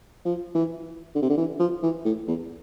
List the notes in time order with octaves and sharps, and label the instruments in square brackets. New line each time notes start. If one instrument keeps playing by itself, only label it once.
[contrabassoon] F3
E3
D3
C3
D3
E3
F3
E3
A2
E2